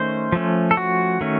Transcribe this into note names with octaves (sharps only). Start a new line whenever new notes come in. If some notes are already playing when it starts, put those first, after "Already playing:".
Already playing: D#3 A3 C#4 C5
F3 A3 C#4
A4
F#4
D#3 A3 C#4